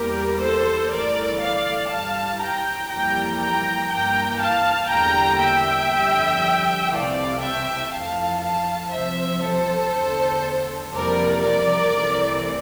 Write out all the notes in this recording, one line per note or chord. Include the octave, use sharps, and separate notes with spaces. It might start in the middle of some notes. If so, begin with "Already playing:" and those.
Already playing: E2 E3 G3 A#3 G4 A#4
A4 C5
G1 G2 E3 A3 A#4 D5
D5 F5
G2 E3 G3 F5 A5
G5 A#5
F2 E3 G3 A#3 G5 A#5
G5 A#5
G2 E3 A#3 G5 A#5
F5 A5
E2 D3 G3 A#3 G5 A#5
E5 G5
G1 F2 D3 G3
C2 C3 E3 A3 D5 F5
E5 G5
F2 E3 A3 F5 A5
F5 A5
C2 C3 F3 C5 E5
A4 C5
E2 D3 A3
F2 C3 E3 G3 A#3 A#4 D5
A#4 D5
C2 C3 E3 A3